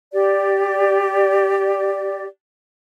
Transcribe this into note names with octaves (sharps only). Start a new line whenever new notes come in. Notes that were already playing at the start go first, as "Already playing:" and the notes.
G4 D5